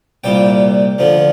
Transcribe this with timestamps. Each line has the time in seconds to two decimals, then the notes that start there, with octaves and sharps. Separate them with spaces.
0.24 C2 A#2 G3 G5
0.98 D2 D3 F3